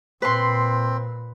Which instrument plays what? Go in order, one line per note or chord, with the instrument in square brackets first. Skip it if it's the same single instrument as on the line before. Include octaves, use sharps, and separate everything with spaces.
[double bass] A#2 [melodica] C4 [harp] B4 C6